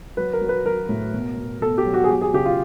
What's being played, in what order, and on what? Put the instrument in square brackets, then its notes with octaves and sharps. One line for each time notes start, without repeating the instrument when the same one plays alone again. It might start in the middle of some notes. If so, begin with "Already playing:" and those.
[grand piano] F#3 B4
A#4
F#3
B4
F#3 A#4
A2
B2
B2
B2 A4
G4
F#3
F#4
G#4
F#3 G4
G#4
C#3 G4
F4